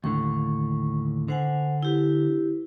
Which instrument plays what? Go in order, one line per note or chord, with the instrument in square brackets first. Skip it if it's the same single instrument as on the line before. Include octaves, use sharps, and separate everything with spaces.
[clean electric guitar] D#2 A2 D3 [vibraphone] C#6
[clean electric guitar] D3 [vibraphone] C5 F#5 G#5
[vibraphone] E4 G4 B4